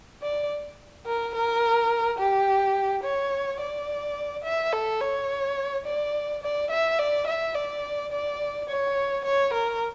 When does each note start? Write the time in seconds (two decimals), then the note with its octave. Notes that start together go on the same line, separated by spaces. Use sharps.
0.22 D5
1.06 A#4
1.35 A#4
2.18 G4
3.03 C#5
3.60 D5
4.44 E5
4.73 A4
5.01 C#5
5.86 D5
6.43 D5
6.70 E5
6.99 D5
7.27 E5
7.55 D5
8.12 D5
8.69 C#5
9.25 C#5
9.54 A#4